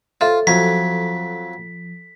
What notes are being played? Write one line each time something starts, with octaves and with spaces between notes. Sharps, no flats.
F4 A4 C5 C#5 E5
F2 F3 F#3 B6